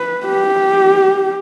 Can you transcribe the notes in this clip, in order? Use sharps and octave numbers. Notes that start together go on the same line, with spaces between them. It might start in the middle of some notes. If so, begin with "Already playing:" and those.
Already playing: B4
G4